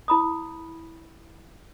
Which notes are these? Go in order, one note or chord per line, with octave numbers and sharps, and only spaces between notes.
E4 B5 D#6